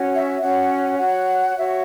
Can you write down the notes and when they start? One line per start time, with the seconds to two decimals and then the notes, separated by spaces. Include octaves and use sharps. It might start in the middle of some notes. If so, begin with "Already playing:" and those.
Already playing: C#4 F#4 C#5
0.13 E5
0.42 C#4 F#4 C#5 F#5
0.98 F#4 C#5 F#5
1.57 F#4 C#5 E5